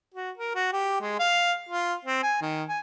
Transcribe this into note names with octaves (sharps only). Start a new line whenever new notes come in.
F#4
A#4
F#4
G4
G#3
F5
F4
C4
G#5
D#3
G#5